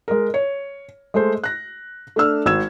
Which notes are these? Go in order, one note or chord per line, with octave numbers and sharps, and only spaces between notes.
G#3 A#4
C#5
G#3 A3 C5
F#6 A#6
A3 D4 E6 F6
G#1 E6 G#6 E7